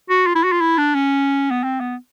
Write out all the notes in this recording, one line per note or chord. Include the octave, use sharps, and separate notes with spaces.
F#4
F4
E4
F#4
F4
E4
D4
C#4
B3
C4
B3